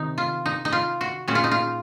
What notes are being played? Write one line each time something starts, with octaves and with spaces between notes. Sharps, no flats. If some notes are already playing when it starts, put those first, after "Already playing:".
Already playing: C3 D#3 D#4
F4
D#4
D#4
F4
F#4
A#2 G#3 C#4 F#4
F4
D#4
F4